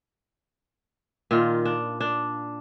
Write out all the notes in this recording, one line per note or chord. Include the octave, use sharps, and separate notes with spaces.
A#2 D#3 F4
D4
D4